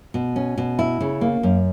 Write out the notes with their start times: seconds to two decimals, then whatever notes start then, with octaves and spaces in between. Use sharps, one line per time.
0.14 B2
0.36 C#4
0.58 B2
0.79 E4
1.00 C#3
1.21 A#3
1.43 F#2